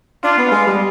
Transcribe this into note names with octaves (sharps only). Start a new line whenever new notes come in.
D4 F4
B3
G#3
G3